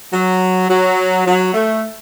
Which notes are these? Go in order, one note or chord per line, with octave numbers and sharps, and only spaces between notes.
F#3
F#3
F#3
A3